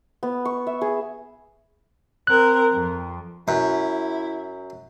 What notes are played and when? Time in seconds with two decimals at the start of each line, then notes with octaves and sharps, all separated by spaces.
0.23 B3
0.45 C#6
0.67 E5
0.81 G#4
2.27 C4 A#4 F#6
2.73 F2
3.48 F#2 E4